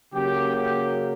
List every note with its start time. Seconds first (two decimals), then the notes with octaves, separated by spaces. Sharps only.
0.14 C#3 F#3 A#3 G4
0.53 G4